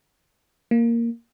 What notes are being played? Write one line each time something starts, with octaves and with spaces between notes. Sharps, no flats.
A#3